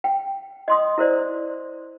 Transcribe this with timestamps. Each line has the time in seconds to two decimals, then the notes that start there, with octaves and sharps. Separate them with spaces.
0.04 G5
0.68 D#5 C6 D#6
0.98 E4 A#4 C5 D5